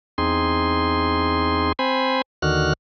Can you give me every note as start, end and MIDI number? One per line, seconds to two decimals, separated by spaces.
0.18 1.72 40
0.18 1.72 60
0.18 1.72 63
0.18 1.72 68
0.18 1.72 84
1.79 2.22 60
1.79 2.22 72
1.79 2.22 80
1.79 2.22 83
2.42 2.73 39
2.42 2.73 50
2.42 2.73 51
2.42 2.73 66
2.42 2.73 89
2.42 2.73 90